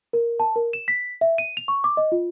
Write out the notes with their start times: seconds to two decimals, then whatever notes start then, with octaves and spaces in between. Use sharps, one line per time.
0.13 A#4
0.40 A5
0.56 A#4
0.73 E7
0.88 B6
1.21 E5
1.38 D#7
1.57 F7
1.68 C#6
1.84 D6
1.97 D#5
2.12 F4